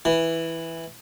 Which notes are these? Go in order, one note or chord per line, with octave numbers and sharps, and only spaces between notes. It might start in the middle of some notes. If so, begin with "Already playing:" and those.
E3